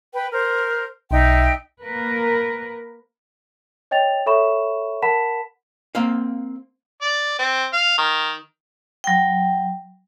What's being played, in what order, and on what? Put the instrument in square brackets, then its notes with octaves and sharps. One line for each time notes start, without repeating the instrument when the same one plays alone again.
[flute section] B4 G5
A#4 C5
[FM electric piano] B1 [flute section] D#4 E5 G5
[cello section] A#3 A#4 B4
[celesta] C#5 D#5 G5 A6 F7
A4 C#5 E5 B5 C#6 E7
A#4 F#5 A5 B5 B6 E7
[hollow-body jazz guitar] A#3 C4 F5
[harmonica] D5
C4
F5
D#3
[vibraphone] F#3 G5